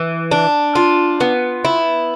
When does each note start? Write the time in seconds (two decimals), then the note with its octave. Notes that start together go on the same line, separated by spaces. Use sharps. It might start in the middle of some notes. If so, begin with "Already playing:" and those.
Already playing: E3
0.31 D4
0.75 F4
1.20 B3
1.65 E4